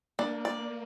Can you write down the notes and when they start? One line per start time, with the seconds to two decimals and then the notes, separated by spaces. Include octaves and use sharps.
0.19 A#3 D4
0.45 D5